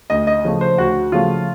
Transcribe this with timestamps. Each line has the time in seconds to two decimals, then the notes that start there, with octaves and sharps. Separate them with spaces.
0.10 D2 D#5
0.27 D#5
0.44 C#3 F3 A3
0.61 C5
0.78 D2 F#4
1.12 C#3 F3 A3 F4